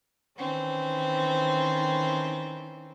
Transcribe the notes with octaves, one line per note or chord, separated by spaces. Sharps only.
D#3 E3 C4 C#4